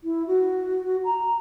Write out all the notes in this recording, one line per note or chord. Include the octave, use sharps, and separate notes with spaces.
E4
F#4
A#5